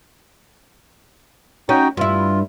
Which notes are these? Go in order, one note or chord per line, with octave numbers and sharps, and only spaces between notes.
C#4 D#4 F#4 G5
G2 E4 F4